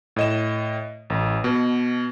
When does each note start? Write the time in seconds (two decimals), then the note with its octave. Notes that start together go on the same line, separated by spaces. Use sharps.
0.16 A2 D#5 E7
1.10 A1
1.44 B2